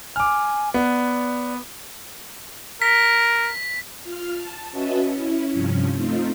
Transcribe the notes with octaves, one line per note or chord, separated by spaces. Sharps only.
G#5 D6 F6
B3 D5
A#4 B6
F4 F6
A5
C#4 F#4 B4 D#5 E5 A5
C#4 E4
G2 C3 F3 C#4
A3 C4 D#4 F4